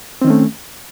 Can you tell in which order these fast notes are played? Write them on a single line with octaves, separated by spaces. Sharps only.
C4 D#3 C#4 A3